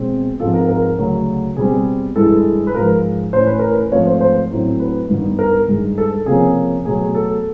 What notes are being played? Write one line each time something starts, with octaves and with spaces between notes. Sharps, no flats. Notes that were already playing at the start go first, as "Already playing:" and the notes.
Already playing: B2 G#3 C4
G#2 F3 G#3 C4 A4
A#4
A#4
D2 C#3 F#3
B2 G3 C4 G#4
G2 E3 G#3 A4
B4
G#2 F3 G#3 A#4
A2 E3 A3 C#4 C5
B4
A#4
B4
G#2 F3 A3 C4 C#5
C5
C5
A2 F#3 A3 C4
B4
G2 D#3 G3 B3
A#4
G2 D#3 G#3
A4
C3 F3 A#3 C#4 G#4
B2 F#3 A3 G#4
G#4
A4